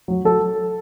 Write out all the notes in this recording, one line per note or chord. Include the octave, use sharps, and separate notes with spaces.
F#3
F#3 A4